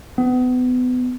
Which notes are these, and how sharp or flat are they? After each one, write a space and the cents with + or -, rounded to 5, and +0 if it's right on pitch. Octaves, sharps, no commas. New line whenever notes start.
B3 +30